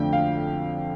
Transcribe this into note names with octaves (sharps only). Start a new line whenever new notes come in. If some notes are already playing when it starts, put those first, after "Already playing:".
Already playing: F2 D3 F3 A3 D4 G5
F5